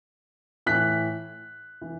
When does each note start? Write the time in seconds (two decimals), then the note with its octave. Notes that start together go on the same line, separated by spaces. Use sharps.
0.66 A2 E3 F#6 B6
1.82 E3